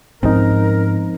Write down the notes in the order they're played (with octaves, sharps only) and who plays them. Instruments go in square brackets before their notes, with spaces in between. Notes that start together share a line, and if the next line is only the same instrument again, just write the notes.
[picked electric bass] G#2 [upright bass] F3 C#4 [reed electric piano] C4 D#4 [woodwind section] A#4